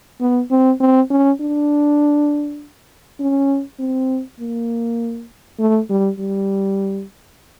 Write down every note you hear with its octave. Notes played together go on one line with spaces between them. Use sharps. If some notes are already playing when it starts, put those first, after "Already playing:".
B3
C4
C4
C#4
D4
C#4
C4
A#3
A3
G3
G3